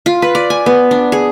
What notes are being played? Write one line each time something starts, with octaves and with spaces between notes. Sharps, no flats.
F4
B4
D5
G#5
B3
D4
G#4